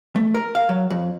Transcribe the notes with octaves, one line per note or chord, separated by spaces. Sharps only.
A3
A#4
F5
F#3
F2